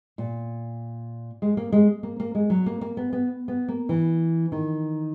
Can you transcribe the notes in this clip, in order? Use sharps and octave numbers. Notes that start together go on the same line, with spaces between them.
A#2
G#3
A#3
G#3
A#3
A#3
G#3
F#3
A#3
A#3
B3
B3
B3
A#3
E3
D#3